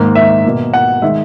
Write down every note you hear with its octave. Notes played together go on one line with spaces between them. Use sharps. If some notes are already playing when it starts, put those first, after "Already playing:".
Already playing: G#2 D#3 A#3
E5
B2 A#3
F#5
D#3 G#3 E5